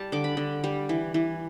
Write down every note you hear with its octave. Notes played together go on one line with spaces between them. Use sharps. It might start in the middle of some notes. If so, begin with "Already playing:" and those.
Already playing: G3 A5
D3 D6
B5
D3
G3
E3
E3